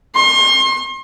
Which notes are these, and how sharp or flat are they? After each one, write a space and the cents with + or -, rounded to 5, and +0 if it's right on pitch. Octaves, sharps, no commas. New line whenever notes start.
C6 +35